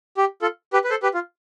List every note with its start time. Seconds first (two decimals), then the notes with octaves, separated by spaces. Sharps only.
0.17 G4
0.42 F4 A4
0.73 G4 B4
0.84 B4
0.90 A4 C5
1.03 G4 B4
1.14 F4